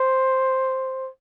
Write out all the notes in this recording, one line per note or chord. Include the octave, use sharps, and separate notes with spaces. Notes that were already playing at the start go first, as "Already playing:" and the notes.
Already playing: C5